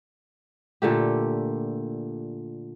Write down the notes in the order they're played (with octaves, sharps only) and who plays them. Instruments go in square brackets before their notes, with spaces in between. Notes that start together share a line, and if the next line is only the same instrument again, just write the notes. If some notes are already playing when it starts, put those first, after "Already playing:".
[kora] A#2 D3 A3 G4